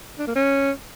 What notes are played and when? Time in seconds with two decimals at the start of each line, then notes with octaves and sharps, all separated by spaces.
0.19 D4
0.27 A#3
0.35 C#4